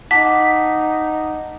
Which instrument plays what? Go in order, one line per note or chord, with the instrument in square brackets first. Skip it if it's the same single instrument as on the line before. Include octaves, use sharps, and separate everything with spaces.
[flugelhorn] D#4 [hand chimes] F#5 A5 D6 [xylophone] B6